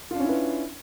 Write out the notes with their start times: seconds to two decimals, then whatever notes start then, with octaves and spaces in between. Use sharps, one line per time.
0.11 F4
0.15 D4
0.20 C#4
0.24 E4
0.29 B4